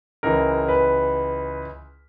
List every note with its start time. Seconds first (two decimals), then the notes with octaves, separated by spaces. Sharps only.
0.23 C#2 C#3 E3 A#4
0.68 B4